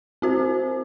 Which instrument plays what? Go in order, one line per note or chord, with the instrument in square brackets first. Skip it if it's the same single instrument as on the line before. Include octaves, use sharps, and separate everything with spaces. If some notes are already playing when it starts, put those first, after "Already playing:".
[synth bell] C4 F#4 C5